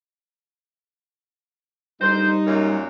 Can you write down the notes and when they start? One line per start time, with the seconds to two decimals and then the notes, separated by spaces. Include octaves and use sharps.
2.02 D2 G3 D#4 A#4 C5
2.46 F#2 A#2